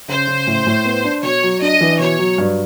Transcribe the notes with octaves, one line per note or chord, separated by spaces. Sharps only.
C#3 C5
C#3
A2
A2
B3
D4
B2 C#5
F#3
D4 D#5
E3
B2 C#5
F#3
G2